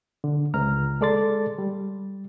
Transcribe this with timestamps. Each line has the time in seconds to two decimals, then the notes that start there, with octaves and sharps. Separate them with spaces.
0.24 D3
0.54 C#2 A#5 F6
1.01 G#3 A4 D5 C6 A6
1.58 G3